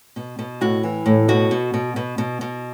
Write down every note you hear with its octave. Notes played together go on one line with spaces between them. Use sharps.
B2
B2
A2 F#4
E3
A2
B2 F#4
B2
B2
B2
B2
B2